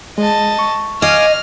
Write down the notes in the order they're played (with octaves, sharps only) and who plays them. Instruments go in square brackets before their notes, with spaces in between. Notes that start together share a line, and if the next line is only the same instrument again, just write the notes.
[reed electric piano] G#3 [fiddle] D#5 A5
[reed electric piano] C#6
[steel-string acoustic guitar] D#5 [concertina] F5 G#5 D6 [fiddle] F6